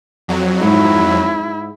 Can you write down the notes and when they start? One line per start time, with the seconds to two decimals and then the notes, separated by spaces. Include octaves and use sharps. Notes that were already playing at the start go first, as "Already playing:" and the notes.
0.28 F2 F#3
0.61 G#2 E4